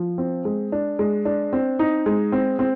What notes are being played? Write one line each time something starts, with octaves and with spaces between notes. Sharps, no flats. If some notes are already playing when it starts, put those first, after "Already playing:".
Already playing: F3
C4
G#3
D4
G#3
D4
C4
D#4
G#3
C4
C4